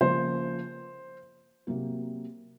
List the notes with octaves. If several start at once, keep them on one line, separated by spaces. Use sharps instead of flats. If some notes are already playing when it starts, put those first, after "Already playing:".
C#3 F3 A#3 C5
C3 F#3 A#3